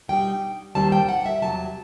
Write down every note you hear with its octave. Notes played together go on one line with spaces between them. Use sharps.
B2 G3 D#4 G5
D#2 D#3 G3 C4 D#4 A5
G5
F#5
E5
E2 C3 F#3 A5